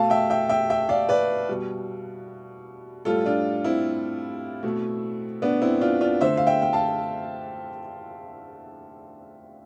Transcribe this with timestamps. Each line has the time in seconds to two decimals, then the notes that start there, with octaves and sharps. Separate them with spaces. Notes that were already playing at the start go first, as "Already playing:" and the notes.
Already playing: B2 A3 F5 A5
0.10 E5 G5
0.30 E5 G5
0.49 E5 G5
0.70 E5 G5
0.89 D5 F5
1.09 B4 D5
1.49 B2 G3
3.05 A2 G3 F4 A4
3.26 D4 F4
3.64 C4 E4
4.63 B2 A3
5.42 B3 D4
5.62 C4 E4
5.81 D4 F4
6.01 D4 F4
6.21 D3 A3 C5 E5
6.37 F5
6.47 E5 G5
6.62 G5
6.73 F5 A5